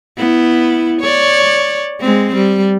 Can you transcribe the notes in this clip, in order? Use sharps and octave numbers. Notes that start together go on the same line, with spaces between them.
B3 E4
C#5 D5
G#3 C4
G3